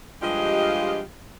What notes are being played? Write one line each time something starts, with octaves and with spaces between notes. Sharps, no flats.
G2 F3 G#3 F4 G4 D#5